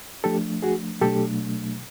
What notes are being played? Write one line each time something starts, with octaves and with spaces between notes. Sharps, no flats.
F3 A3 D4 G4 A4
F#4 G#4
B2 F#3 A3 D4 G4 A4